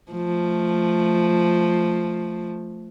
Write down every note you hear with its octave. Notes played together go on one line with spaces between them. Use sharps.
F3 A3